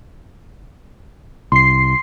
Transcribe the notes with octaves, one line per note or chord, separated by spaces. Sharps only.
C2 C6 C7